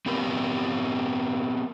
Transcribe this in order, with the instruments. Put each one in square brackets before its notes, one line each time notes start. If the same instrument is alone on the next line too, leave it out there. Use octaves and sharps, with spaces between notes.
[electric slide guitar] B3 C4 G4 A#4 B4